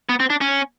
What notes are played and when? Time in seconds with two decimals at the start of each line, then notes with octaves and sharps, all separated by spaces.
0.09 B3
0.20 C4
0.30 D4
0.41 C#4